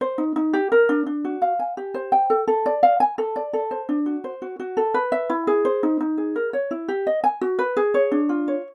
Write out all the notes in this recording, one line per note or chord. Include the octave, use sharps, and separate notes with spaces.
C5
D#4
D#4
G4
A#4
D4
D4
F#4
F5
G#5
G4
C5
G5
A4
A4
D5
F5
G#5
A4
D5
A4
C5
D4
F#4
C5
F#4
F#4
A4
B4
E5
E4
G#4
C5
D#4
D#4
G#4
A#4
C#5
E4
G4
D#5
G#5
F#4
B4
G#4
C#5
D4
F4
C#5